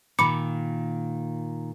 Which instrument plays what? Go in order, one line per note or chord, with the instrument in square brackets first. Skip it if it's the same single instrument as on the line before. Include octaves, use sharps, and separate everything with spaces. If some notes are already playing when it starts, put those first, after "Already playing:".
[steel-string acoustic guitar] A#2 D#3 [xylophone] B5 D6 C#7